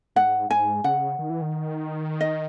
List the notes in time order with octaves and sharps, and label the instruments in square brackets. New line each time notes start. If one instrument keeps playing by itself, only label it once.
[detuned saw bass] G#2 [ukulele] F#5
[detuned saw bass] G#2 [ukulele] G#5
[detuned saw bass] C#3 [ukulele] F#5
[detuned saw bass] D#3
E3
D#3
[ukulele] D#5